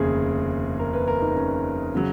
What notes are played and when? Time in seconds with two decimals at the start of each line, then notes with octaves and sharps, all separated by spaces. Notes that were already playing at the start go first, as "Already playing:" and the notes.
Already playing: F1 D#2 C#3 G#4
0.79 A#4
0.93 B4
1.08 A#4
1.22 D#4
1.36 C#4
1.95 C#3 F#3